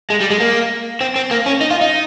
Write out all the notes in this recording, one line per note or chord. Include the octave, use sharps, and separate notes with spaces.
G#3
G3
G#3
A#3
C4
C4
A#3
C#4
D#4
F4
D#4